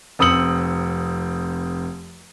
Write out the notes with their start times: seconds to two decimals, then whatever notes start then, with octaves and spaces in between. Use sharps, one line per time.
0.19 F1 C4 D#6 E6 C#7 F#7